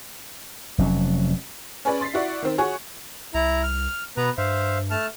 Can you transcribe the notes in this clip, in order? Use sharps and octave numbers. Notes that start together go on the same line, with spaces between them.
F1 F#3 C#4
C#4 G#4 B4 D5
C6 A6 B6 C7
E4 F#4 D5
D#3 C4
F#4 G#4 C#5
C2 E4 A#5
F6
B2 B3 B4 A#5
G2 C5 E5 F5
A3 A5 F6